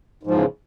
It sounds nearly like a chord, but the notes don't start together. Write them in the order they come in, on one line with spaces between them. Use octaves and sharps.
G#2 F3 E2 C#3